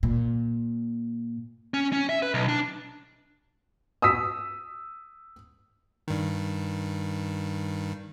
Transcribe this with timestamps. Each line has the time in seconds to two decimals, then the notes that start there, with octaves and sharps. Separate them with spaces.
0.03 A#2
1.74 C#4
1.93 C#4
2.09 E5
2.22 B4
2.34 B1
2.48 D4
4.02 D#6 E6 B6
6.08 G2 D#3